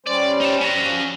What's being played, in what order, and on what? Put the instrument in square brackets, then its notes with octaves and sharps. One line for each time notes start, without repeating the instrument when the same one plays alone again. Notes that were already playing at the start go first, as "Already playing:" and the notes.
[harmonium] G3 C#4 C5 [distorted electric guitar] D5
[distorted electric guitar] D#4 A5
C#4 A#5
[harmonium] F3